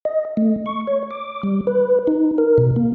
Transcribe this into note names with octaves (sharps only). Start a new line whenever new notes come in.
D#5
A3
C#6
C#5
D6
G3
B4
D#4
A#4
B2
A#3